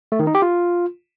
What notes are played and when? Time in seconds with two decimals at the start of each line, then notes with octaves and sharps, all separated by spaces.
0.12 A3
0.19 D#3
0.27 D#4
0.35 G4
0.42 F4